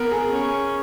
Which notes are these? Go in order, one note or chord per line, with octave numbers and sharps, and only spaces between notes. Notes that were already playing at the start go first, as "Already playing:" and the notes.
Already playing: B3 A#4
G#4
C#4